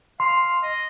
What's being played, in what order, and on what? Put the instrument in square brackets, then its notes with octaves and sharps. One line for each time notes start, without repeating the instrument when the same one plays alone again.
[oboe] F5 [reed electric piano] C6
[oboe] D#5